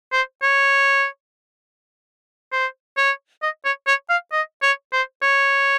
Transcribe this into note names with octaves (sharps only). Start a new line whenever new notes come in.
C5
C#5
C5
C#5
D#5
C#5
C#5
F5
D#5
C#5
C5
C#5